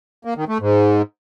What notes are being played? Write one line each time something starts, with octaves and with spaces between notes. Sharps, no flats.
A#3
D#3
A3
G#2